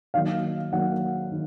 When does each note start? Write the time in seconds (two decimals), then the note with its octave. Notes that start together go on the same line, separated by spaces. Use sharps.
0.14 D#3 F#3 A#3 F5
0.72 D#3 F#3 A#3 F#5
1.31 D#3